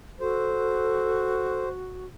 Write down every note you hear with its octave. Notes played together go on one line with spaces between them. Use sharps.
F#4 A4 C5